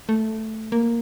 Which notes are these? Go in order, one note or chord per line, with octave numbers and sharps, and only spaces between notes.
A3
A#3